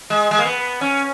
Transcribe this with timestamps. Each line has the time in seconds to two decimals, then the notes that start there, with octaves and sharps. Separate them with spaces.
0.10 G#3
0.31 G#3
0.38 A#3
0.45 B3
0.81 C#4